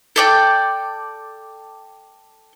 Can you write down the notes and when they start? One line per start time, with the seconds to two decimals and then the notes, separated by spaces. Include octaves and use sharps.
0.16 A4 D5 G5